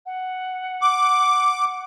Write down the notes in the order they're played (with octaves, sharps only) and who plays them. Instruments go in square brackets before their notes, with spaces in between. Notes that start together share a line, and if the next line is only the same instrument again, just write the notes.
[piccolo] F#5
[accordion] D6